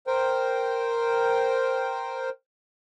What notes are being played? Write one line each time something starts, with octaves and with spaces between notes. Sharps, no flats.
A#4 C5 G5